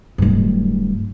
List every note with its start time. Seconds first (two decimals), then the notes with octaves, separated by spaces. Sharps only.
0.18 D1 G2